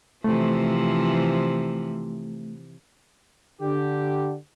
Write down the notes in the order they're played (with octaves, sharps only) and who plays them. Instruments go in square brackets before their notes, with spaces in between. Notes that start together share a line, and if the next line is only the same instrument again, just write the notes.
[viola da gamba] C3 E3 F3 [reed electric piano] A3
[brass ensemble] D3 G4